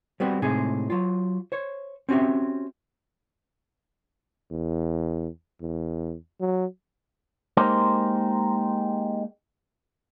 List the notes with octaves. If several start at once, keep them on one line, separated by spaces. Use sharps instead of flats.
G3 B3 C4 F#4
A2 C3 G#3 D#4 G#4
F#3 F4
C5 C#5
C4 C#4 F#4 G4 E5
E2
E2
F#3
G#3 A#3 D#4 G4 A#4 C5